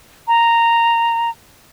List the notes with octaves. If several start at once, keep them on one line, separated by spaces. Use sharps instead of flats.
A#5